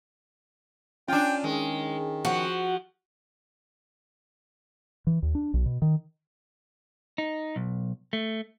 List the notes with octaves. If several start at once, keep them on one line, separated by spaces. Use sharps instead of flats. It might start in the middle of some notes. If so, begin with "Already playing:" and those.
C#4 D4 F4 G5
D#3 G#3
F3 F#4
E3
D#2
D4
B1
B2
D#3
D#4
B1
A3